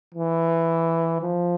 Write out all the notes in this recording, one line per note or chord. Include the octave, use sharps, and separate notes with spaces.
E3
F3